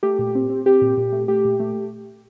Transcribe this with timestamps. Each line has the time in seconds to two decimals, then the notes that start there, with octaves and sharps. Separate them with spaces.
0.03 A3 G4
0.19 A#2
0.35 C4
0.50 C4
0.66 C4 G4
0.82 A#2
0.97 A#2
1.12 A3
1.28 A3 G4
1.45 A#2
1.60 A3